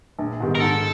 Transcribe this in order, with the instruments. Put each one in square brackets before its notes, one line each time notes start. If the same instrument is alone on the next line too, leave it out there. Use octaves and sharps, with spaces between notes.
[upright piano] A#1
G#2 D#3 G3 B3
[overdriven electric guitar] A#4
[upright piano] G#2 [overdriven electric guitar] A4